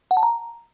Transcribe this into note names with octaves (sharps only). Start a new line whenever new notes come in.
F#5
A5
A#5